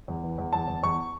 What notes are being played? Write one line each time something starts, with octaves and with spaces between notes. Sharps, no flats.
E2
E3
E2
E2 A5
E2
E2 C#6